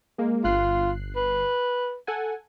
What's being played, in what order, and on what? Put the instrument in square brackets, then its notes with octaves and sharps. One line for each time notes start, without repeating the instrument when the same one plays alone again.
[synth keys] G#3 A#3
[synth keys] G1 F#6 C7 [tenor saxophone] F4
[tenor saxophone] B4
[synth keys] A4 F#5 G#5